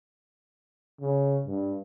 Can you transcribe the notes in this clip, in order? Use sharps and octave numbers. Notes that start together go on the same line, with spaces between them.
C#3
G2